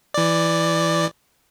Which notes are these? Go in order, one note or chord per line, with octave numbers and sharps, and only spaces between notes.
E3 D5